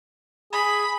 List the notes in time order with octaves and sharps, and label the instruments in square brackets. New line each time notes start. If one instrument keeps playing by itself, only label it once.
[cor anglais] G#4 [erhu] B5